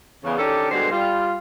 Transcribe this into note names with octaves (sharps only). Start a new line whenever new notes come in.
E2 C#3
D#3 C#4 D4 G4 A4
G2 B2 D3 F#3 G#3 C5
G3 F4